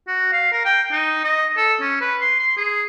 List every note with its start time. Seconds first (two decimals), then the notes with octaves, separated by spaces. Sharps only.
0.08 F#4
0.32 F5
0.52 A#4
0.65 G5
0.92 D#4
1.24 D#5
1.57 A4
1.81 C#4
2.01 B4
2.21 C6
2.39 C6
2.57 G#4